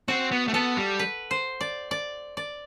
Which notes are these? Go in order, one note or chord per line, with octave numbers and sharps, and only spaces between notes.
C4 F#4
B3
A3
B3 A4
G3
B4
C5
D5
D5
D5